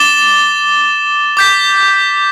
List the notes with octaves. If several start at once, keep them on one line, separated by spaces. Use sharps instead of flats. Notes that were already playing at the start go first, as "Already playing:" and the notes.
Already playing: D6 A6 E7 G7
D6 G6 B6